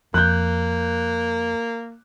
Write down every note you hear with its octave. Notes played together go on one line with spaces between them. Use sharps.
F2 A#3 F#6 G6